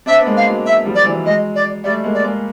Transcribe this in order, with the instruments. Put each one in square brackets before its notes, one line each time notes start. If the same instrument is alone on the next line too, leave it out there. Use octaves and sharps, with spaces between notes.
[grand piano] C4 D4 [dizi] E5
[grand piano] B3
G#3 A#3
[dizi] F5
[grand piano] F#3 G#3
[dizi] E5
[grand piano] F3 G3
[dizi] D5
[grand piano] E3 F#3
[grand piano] F#3 G#3 [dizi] D#5
[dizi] D5
[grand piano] G3 A3 [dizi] D5
[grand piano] G#3 A#3
[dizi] D5
[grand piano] G#3 A#3